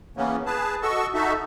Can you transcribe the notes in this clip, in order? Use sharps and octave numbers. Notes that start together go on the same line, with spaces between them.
C#3 E3 A#3 B3 C#4
G#4 B4 A5
F#4 A4 D#5 C#6 E6
D#4 F#4 A4 E5